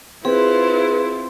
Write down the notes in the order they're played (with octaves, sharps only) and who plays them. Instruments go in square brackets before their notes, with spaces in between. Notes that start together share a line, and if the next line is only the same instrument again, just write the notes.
[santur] C4 [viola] E4 F4 [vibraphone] G#4 [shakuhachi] B4